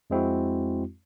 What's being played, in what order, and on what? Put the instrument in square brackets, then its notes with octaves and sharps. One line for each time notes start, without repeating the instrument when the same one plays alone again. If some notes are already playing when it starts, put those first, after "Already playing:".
[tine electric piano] F2 G#3 C4 E4 F#4